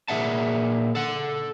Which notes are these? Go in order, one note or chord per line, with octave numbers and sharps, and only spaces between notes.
A#2 G#4 E5 F#5 A5
A4 F#5